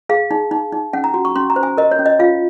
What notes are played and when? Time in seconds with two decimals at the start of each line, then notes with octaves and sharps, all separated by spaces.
0.09 G#4 F5
0.31 D#4
0.51 D#4
0.72 D#4
0.93 C#4 F#5
1.04 A#5
1.14 F#4
1.25 C#6
1.36 C#4 C6
1.50 A#5
1.56 C5
1.63 G#5
1.77 A#4 D#5
1.91 C#5
1.99 C#4
2.06 D#5
2.19 F4 F5